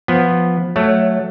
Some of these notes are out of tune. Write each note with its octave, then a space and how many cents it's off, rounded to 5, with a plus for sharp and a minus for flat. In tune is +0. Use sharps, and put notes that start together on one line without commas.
F3 +5 B3 +0
F#3 -5 A3 +0 C#5 +15